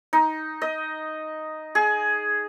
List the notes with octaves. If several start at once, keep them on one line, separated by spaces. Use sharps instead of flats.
D#4
D#5
G#4